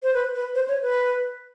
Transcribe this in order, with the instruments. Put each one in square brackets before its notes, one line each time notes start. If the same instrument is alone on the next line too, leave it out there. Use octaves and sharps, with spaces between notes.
[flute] C5
B4
B4
C5
C#5
B4